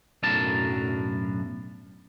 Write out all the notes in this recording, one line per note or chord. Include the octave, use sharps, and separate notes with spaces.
B1 F#2 A2 D4 A#4 A5